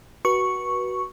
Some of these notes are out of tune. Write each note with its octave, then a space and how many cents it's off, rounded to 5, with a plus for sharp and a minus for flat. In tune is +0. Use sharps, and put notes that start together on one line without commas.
F#4 +15 B4 -25 C#6 +0